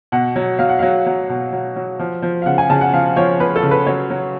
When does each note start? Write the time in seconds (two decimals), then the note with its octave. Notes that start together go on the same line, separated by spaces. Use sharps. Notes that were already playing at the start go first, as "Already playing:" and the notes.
0.12 B2 F#5
0.36 F#3
0.59 F#3 F5
0.69 F#5
0.79 F#3 F5
1.06 F#3
1.29 B2
1.53 F#3
1.76 F#3
1.99 F3
2.22 F3
2.42 F5
2.46 C#3 F#5
2.58 G#5
2.70 C#3 A5
2.81 F#5
2.93 F3 F5
3.16 F3 C#5
3.40 F3 B4
3.56 A4
3.63 C#3
3.71 B4
3.86 F#3 C#5
4.10 F#3